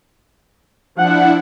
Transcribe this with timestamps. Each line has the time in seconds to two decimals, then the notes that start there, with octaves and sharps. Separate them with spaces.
0.97 F3 D4 E4 F#5